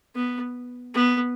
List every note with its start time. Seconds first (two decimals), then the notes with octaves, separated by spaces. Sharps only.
0.15 B3
0.95 B3